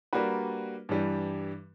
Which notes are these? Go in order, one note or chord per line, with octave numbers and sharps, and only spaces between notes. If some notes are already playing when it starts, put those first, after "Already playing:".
G3 A#3 D4 F#4 B4
G2 E3 G3